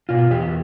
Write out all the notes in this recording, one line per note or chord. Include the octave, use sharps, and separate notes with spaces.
B2 F4
E2 G4